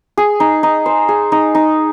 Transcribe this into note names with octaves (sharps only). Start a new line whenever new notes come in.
G#4
D#4
D#4
C5
G#4
D#4
D#4